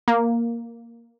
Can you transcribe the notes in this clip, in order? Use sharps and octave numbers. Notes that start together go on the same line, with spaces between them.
A#3